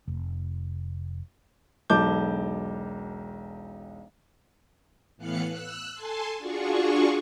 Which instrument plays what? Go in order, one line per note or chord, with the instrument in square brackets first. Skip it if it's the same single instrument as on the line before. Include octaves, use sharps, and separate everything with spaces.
[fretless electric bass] F1
[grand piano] E1 B1 A5 D6 G6
[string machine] A2 E3 B3 F5 F#6 C#7
E6 F#6
A4 G#5 A5 C6
D4 F4 F#4 G#4 C#6